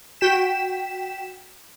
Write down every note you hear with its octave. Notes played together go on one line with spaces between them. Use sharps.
F#4 G5 B6 E7